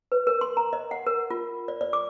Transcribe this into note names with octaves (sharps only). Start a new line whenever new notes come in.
B4
A#4
C6
A#5
D#5
F#5
A#4
F4
D5
D5
D6